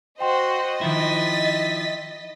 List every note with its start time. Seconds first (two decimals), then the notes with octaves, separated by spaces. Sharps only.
0.20 F#4 C5 D#5 G5 C6
0.81 D#3 F3 E4 A6 B6